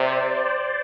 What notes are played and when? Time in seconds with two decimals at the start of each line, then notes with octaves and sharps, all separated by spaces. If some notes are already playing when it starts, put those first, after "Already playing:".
Already playing: C3 C5 D5